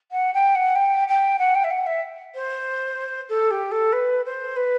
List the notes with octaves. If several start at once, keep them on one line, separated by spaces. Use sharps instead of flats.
F#5
G5
F#5
G5
G5
F#5
G5
E5
F#5
E5
C5
A4
G4
A4
B4
C5
B4